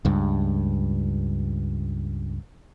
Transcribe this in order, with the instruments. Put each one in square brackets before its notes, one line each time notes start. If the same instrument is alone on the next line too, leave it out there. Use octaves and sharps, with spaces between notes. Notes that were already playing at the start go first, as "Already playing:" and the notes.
[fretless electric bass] C#2 G2